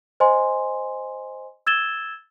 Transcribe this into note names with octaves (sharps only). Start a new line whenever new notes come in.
C5 D#5 G#5 C6
E6 G#6 A6 E7 G7